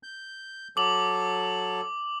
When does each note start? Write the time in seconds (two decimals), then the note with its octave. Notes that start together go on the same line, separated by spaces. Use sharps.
0.03 G6
0.77 F#3 A4 D6 F#7